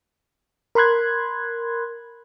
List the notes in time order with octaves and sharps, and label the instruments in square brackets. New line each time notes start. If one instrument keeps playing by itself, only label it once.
[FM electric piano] A#4 B5 C6 F#6 G#6